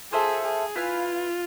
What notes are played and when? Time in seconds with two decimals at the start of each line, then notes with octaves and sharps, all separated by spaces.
0.12 F4 G#4 A4 C5 E5
0.44 G#4
0.76 E4 F4 B4 F5 G#5